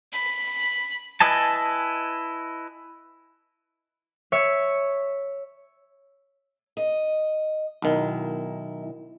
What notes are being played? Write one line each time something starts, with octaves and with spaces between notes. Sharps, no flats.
B5
E4 B4 D#5 G#5 A5
C#5 E5
D#5
B1 D#3 E4